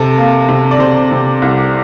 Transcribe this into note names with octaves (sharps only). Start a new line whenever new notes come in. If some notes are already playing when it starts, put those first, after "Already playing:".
Already playing: C3 A4
A#3
C3
D5
C3 C5
C3
C2